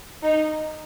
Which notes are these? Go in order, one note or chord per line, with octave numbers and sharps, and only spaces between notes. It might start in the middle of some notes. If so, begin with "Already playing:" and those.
D#4